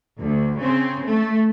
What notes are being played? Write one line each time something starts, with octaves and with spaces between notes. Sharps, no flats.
D2
C#3 C4
A3